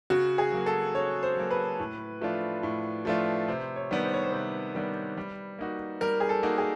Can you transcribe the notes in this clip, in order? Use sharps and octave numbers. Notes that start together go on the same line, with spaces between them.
C#3 F#4
G#4
F#3 A#3
A4
C#3 C#5
C5
F#3 A#3
B4
A2
F3 A3 D4 F4
A2
F3 A3 D4 F4
C3 C5
C#5
D#3 G3 B3 D4
C5
C#5
C5
C3 B4
D#3 G3 B3 D4
G3
A#3 D#4 F#4
G3 A#4
G#4
A4
A#3 D#4 F#4
G#4